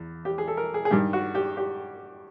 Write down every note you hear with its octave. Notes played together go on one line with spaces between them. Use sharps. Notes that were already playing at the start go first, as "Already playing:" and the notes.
Already playing: E2
G4
G#4
A4
A#4
G#4
G#4
G2 D#3 G4
F#4
G4
G4